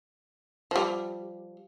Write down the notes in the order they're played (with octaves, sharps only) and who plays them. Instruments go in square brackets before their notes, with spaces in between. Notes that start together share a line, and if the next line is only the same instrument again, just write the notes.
[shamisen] F3 G3